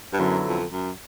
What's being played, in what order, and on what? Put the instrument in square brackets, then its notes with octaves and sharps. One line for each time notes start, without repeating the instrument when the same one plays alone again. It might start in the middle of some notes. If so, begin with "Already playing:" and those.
[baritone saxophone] G2
[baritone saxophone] F#2 [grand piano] D3 F#3 B3 E4 A4
[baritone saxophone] F2
F#2